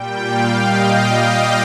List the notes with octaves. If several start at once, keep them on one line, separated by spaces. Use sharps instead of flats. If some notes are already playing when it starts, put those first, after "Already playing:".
Already playing: A#2 G3 G5
F5
D#5
D#5